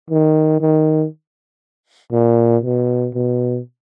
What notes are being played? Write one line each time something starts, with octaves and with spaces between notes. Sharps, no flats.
D#3
D#3
A#2
B2
B2